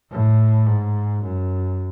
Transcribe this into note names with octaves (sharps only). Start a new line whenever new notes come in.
A2
G#2
F#2